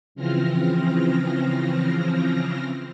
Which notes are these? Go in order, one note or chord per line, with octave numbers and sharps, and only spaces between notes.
C#3 E3 F3 C4 F6 A#6